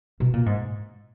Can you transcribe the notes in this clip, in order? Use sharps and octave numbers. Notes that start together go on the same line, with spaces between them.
B2
A#2
G#2